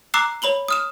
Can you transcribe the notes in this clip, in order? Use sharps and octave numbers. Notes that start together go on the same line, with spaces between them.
A#5 D6 E6 F#6 C7
C#5 B5 F#7 G7
D#6 F6 E7